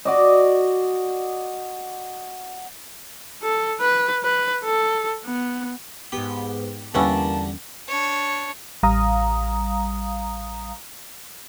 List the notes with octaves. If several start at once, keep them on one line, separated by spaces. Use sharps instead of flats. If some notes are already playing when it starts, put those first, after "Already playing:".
F#4 D5 D#5
A4
B4
B4
A4
B3
G#2 B3 G4
E2 D3 G3 A#3 B3 C#4 E4 A5
D4 C#5
A1 G3 F5 A#5 D#6